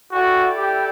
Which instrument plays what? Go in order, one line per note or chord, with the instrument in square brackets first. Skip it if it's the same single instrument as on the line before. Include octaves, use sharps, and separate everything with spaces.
[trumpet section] E4 A4 D5 G5 [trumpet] F#4
[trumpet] G4